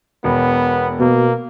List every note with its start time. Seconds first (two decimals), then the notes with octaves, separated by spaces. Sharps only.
0.24 E1 B3
1.00 B2 A#3